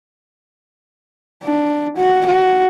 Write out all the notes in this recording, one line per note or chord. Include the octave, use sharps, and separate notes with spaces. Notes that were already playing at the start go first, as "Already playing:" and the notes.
D4
F#4
F#4